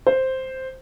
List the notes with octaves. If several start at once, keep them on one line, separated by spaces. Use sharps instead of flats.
C5